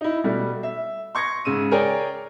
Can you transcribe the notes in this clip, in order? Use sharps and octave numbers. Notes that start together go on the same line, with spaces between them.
D#4 E4
B2 G3 A3
E5
C6 C#6 G#6 A#6 C#7
G#2 C#3 E6 D#7
G#4 A#4 C#5 D5 G5